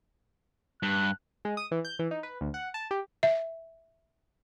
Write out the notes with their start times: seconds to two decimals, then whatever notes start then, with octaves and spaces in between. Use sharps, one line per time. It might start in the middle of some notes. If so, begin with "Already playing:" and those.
0.83 G2 F#6
1.45 G#3
1.57 D#6
1.71 E3
1.85 G6
1.99 E3
2.11 D#4
2.23 B4
2.41 D2
2.54 F#5
2.74 A5
2.91 G4
3.23 E5